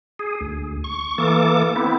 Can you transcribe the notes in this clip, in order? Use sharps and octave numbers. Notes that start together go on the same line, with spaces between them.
G#4
D2
C#6
E3 A#3 A4 D6
B3 C4 E4